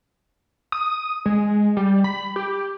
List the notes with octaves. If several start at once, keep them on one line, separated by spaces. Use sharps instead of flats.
D#6
G#3
G3
B5
G4